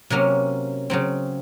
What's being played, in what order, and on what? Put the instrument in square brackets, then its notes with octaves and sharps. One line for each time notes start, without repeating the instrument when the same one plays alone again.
[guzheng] C3 F#3 A#3 C#4
C#3 F#3 C4